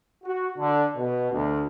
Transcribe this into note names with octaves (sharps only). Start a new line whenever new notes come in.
F#4
D3
B2
D2